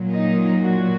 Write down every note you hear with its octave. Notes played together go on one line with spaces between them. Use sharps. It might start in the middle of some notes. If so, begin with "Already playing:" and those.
Already playing: A#2 F#3
D#4
F#4